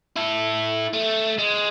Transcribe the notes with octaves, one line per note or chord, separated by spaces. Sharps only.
E4 A4
A3
G#3